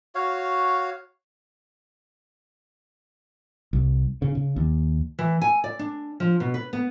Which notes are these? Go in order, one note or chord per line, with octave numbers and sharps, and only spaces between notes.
F#4 C#5 F5
C2
C#3
C#3
D#2
E3
G#5
D5
D4
F3
B2
B4
B3